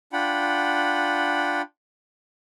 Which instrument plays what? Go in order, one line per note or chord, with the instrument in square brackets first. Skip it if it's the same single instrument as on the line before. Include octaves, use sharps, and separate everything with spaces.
[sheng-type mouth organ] D4 F4 F#5 G5 B5